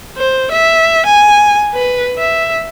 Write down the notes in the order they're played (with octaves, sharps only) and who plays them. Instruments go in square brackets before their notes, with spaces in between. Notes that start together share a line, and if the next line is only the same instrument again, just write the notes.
[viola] C5
E5
G#5
B4
E5